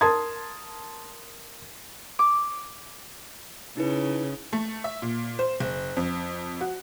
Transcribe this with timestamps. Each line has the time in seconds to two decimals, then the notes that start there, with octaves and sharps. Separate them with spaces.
0.01 A#4 A5 C6 D#6 G#6
2.19 D6
3.77 C#3 D#4 E4 B4
4.53 A3
4.84 E5
5.02 A#2
5.39 C5
5.60 F#1
5.97 F2
6.61 F#4